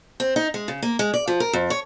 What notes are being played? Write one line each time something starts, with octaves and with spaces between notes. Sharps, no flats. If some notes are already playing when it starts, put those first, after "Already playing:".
C4
D#4
G#3
C#3
A#3
G#3
D5
F3
A#4
F2
C#5